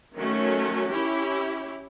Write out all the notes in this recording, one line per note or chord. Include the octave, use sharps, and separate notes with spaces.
D#3 F#3 A3 C#4
C#4 E4 G4